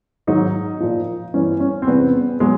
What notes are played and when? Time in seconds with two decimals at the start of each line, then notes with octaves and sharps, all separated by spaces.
0.27 G#2 D#3 F#3 D#4
0.80 A#2 F3
1.34 G2 E3 G3 C#4
1.60 C#4
1.82 C4
1.87 E2 C3 E3 G3 B3
2.40 B2 F#3 G#3